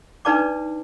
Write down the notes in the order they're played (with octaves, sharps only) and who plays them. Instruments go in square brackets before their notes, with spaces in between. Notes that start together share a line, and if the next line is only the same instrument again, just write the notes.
[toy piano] D4 D#4 B4 D5 A5 D6